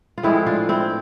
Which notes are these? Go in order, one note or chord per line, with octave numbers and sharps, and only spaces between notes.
F4
A2 F3 G#3 C4 E4
D4 F4
C4 E4